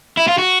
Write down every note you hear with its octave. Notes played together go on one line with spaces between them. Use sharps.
E4
F4
F#4